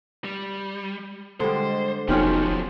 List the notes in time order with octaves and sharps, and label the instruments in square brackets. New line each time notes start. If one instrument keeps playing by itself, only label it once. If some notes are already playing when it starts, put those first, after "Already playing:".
[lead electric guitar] G3
[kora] D3 G3 [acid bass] G#3 [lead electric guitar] C5
[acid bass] F1 [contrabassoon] B1 [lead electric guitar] F3 F#3 [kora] C#4 F4 G4